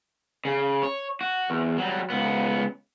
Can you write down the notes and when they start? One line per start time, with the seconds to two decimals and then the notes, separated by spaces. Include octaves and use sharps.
0.45 C#3
0.83 C#5
1.21 F#4
1.50 E2
1.78 F#3 G3
2.10 C#2 B3